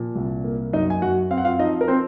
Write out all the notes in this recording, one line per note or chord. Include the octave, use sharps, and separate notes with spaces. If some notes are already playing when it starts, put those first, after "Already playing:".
Already playing: A#2 F3
C2
A#3
F#2 D#4 D#5
G#5
F#2 F#4 F#5
C4 F5
F#5
F4 F5
F3 D#4 D#5
A#4
C4 C5